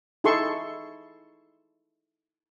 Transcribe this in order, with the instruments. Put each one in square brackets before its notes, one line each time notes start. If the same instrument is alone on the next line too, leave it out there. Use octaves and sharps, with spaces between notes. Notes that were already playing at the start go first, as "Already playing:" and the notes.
[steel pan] D#4 E4 G#4 A4 C6 C#6